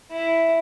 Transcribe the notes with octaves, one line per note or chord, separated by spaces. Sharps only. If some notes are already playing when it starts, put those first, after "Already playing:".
E4